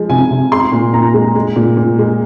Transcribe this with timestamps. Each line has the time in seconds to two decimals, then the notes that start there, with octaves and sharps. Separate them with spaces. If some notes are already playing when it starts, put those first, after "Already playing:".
Already playing: F3 G#3
0.09 C3 G#5
0.31 C3
0.52 G#3 C6
0.72 A#2
0.93 A#2 A#5
1.14 G#3
1.35 G#3
1.56 A#2
1.77 A#2
1.99 G#3